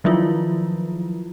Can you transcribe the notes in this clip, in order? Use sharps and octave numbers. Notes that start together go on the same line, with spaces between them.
D#3 F3 F#3 E4 F4